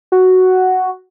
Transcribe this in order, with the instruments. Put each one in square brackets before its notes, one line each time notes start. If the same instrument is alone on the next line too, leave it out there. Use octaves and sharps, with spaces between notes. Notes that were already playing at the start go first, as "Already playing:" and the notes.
[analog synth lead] F#4